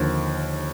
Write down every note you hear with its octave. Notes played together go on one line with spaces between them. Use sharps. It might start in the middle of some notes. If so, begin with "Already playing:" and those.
Already playing: D#2 D3 F3